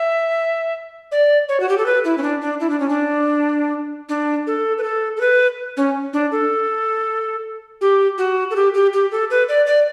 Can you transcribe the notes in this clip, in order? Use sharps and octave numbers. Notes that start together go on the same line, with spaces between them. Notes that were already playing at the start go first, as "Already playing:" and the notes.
Already playing: E5
D5
C#5
F#4
G4
A4
B4
E4
C#4
D4
D4
E4
D4
C#4
D4
D4
A4
B4
A4
A4
B4
C#4
D4
A4
G4
F#4
A4
G4
G4
G4
A4
B4
D5
D5